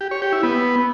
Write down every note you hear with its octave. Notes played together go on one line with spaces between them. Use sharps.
G4
C#5
G4
E4
B3